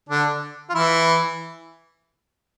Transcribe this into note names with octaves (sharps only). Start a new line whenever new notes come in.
D3 D4
F4
E3 E4